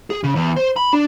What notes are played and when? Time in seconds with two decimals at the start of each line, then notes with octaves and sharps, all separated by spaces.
0.10 G#4
0.24 C#3
0.35 E2
0.56 C5
0.76 B5
0.93 D4